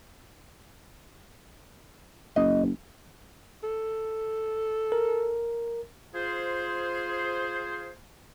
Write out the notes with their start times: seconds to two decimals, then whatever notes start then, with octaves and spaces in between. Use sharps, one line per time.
2.36 F#1 D#5
3.64 A4
4.92 A#4
6.14 F4 G#4 C5